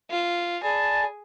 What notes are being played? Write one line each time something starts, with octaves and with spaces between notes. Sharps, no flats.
F4
G#4 D5 G#5 A5 B5